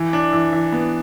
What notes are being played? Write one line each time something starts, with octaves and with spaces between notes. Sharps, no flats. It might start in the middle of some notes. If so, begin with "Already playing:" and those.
Already playing: E3
D4
E3
E3
B3